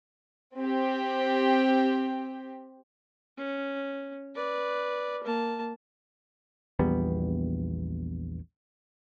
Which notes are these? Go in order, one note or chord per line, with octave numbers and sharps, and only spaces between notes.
C4 G4
C#4
B4 D5
A#3 A5
A#1 E2 G3 B3